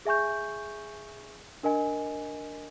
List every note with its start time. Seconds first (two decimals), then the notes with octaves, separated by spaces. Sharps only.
0.05 G#4 E5 G#5 C#6 G6
1.63 D4 A#4 D#5 G#5